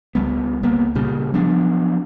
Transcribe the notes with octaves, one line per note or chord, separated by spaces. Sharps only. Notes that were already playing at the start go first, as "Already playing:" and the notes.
C#2 G3 B3
C#2 A#3 B3
A#2 C#3 G3
F3 F#3 B3 D4